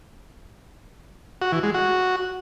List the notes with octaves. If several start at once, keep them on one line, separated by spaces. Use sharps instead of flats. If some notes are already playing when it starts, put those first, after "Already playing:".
F#4
E3
G#3
F#4